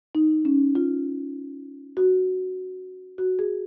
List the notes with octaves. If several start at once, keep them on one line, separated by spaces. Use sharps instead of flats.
D#4
C#4
F4
F#4
F#4
G#4